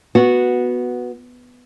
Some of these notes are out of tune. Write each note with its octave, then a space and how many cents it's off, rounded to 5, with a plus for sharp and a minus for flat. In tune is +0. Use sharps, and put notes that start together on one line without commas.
B3 -5 F#4 -10